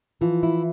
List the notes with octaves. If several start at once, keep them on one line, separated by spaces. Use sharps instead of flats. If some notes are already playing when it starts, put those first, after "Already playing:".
E3 F3
E4